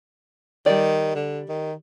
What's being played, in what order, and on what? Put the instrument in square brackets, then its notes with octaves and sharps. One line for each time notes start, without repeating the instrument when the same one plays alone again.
[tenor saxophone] D#3 [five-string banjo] G3 D5
[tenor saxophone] D3
D#3